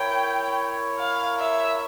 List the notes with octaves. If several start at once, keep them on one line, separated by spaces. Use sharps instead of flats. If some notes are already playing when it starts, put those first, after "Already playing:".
Already playing: E4 A#4 C#5 G5
F5
E5